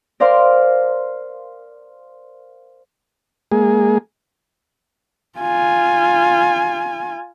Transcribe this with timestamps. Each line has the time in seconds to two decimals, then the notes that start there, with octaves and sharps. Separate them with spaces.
0.20 A#4 C5 D5 F5 C6
3.52 G#3 A#3 G#4
5.39 F4 G#5